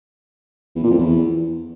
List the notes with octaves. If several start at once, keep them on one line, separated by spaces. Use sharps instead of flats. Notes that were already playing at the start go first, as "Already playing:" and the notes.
E2
A#2
F2
E2